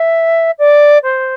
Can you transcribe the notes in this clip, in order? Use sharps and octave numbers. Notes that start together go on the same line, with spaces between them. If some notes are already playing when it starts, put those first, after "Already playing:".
Already playing: E5
D5
C5